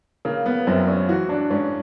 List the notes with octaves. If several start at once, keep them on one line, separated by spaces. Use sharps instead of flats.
C#3 A#3
B3
F#2 C4
C#4
E3 F#4
D4
G#2 C#4